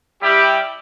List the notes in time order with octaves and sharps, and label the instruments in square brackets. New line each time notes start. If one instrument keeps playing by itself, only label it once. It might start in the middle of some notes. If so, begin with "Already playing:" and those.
[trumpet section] G3 E4 G4